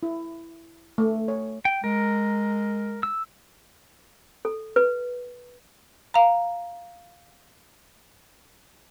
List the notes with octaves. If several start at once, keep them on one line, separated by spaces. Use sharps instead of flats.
E4
A3
C#5
G5
G#3 A#4
E6
A4
B4
F5 A#5